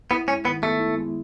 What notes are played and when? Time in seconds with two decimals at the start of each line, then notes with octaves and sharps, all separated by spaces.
0.11 B3 E4
0.28 G#3 C#4
0.45 D#3 B3
0.63 A3 B3
0.80 E4
0.98 G#3